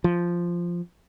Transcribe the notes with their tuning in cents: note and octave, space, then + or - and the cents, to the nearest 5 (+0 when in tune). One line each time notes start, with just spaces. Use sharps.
F3 -5